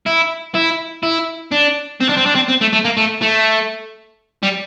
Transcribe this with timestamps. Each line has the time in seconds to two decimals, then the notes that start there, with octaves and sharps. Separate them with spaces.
0.06 E4
0.55 E4
1.03 E4
1.52 D4
2.00 C4
2.09 D4
2.17 C4
2.26 D4
2.35 C4
2.48 C4
2.61 A3
2.73 A3
2.84 A#3
2.97 A3
3.21 A3
4.43 G3